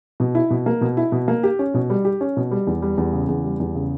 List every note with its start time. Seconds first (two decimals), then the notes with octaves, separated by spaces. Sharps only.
0.20 B2
0.35 E4
0.50 B2
0.66 A#3
0.81 B2
0.97 E4
1.12 B2
1.28 A#3
1.43 G4
1.59 C#4
1.74 B2
1.90 G3
2.05 G4
2.21 C#4
2.37 B2
2.51 G3
2.67 E2
2.82 G3
2.97 E2
3.13 C#3
3.28 E2
3.44 G3
3.60 E2
3.75 C#3